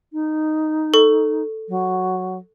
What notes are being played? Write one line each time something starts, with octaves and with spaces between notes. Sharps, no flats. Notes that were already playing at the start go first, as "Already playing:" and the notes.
D#4
A4 C#6
F#3